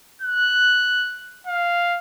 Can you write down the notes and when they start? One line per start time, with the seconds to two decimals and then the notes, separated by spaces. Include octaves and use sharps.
0.22 F#6
1.47 F5